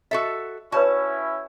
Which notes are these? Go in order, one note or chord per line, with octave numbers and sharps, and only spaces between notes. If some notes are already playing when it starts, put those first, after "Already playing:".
F#4 A4 D#5 E5
C#4 E4 F#4 B4 C#5 D5 A5